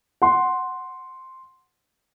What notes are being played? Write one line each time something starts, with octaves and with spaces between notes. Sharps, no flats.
F#5 C6